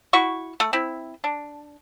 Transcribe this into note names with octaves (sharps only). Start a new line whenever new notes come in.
E4 F#4 C#6
A3
C4 E4
D4